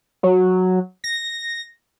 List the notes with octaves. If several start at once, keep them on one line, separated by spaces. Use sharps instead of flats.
F#3
A#6